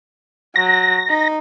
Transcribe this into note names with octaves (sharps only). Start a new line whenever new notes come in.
F#3 A#6
D#4